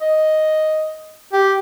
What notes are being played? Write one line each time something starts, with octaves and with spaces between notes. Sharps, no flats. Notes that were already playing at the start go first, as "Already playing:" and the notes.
D#5
G4